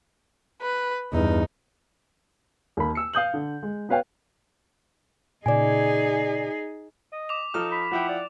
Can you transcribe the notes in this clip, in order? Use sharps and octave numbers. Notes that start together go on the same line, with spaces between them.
B4
E2 G2 D#4
D#2 A#3 B5
E6 C#7
F5 D#6 G6 F#7
D3
G#3
B3 F#4 B4 C#5 F5 G5
A#2 C#3 D#4 G#4 D5 G#5
D#5
D6 F7
F3 D#4 A4 F6
B5
F3 E4 F#5 G5
D5